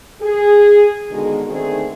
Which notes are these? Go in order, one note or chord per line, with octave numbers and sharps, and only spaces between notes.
G#4
B2 D3 D#3 G#3
D3 D#3 A3 C4 G#4